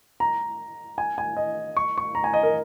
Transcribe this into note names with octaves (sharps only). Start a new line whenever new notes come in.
A#5
G#5
G#5
D#5
C#6
C#6
A#5
G#5
D#5
A#4